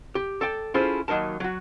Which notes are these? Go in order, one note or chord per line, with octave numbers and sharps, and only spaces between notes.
G4
A4 D5 G5
C#4 E4 F4 G#4 A4 C5
D#2 F#3 D#4 A#4 A5
F#3 F#4